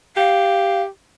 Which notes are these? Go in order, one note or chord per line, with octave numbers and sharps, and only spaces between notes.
G4 F5